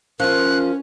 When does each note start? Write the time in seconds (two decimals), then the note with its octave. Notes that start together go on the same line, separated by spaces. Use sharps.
0.20 F3 C#4 F4 A#4 F#6